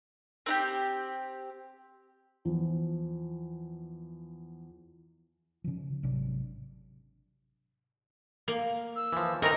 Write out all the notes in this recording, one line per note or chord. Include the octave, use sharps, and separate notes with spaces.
C4 D#4 G4
E2 F3
C#3 F3
G#1 C3 F#3 D4
A#3
E6
E3 F3
D#3 E3 D#4 A#4 A#5 A#6